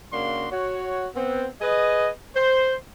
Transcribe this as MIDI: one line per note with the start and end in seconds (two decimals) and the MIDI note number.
0.12 0.47 49
0.12 0.47 58
0.12 0.47 62
0.12 0.47 66
0.12 0.47 84
0.51 1.07 66
0.51 1.07 73
1.15 1.47 59
1.15 1.47 60
1.61 2.09 68
1.61 2.09 71
1.61 2.09 75
2.36 2.75 72